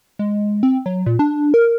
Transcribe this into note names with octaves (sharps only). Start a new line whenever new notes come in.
G#3
C4
F#3
A#2
D4
A#4